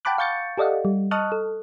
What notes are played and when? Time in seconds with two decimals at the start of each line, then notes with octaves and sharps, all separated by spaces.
0.05 F#5 G5 A5 B5 D6 F#6
0.18 F5 C#6 G6 A6 C#7
0.58 G4 A4 D5 D#5 F5 F#5
0.85 G3
1.11 D#5 A5 C#6 D#6 F6 F#6
1.32 A4